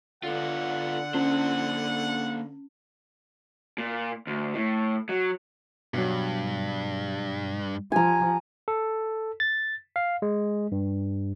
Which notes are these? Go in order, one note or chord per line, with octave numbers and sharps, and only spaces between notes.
D3 B3 F4 F#5
A#3 C#4 C5
A#2
D2
A2
F#3
G2 B2 F#3
F3 G#5 A#5
A4
A6
F5
G#3
G2